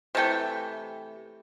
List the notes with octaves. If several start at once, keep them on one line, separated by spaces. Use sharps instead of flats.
C3 E3 A3 G5